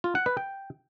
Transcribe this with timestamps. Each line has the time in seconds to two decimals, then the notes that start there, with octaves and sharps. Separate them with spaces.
0.04 F4
0.15 F#5
0.26 B4
0.37 G5